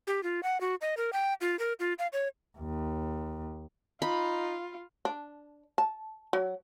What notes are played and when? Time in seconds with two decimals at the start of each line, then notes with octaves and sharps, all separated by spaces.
0.07 G4
0.23 F4
0.43 F#5
0.61 F#4
0.81 D#5
0.97 A#4
1.13 G5
1.41 F4
1.59 A#4
1.80 F4
1.99 F5
2.13 C#5
2.58 D#2
4.02 D#4 F4 B5
5.05 D4
5.78 A5
6.33 F#3